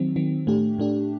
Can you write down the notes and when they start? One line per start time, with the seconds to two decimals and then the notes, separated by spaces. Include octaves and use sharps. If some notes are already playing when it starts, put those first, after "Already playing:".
Already playing: D#3 F#3 C4
0.16 D#3 F#3 C4
0.47 A2 A3 D4 G4
0.78 A2 A3 D4 G4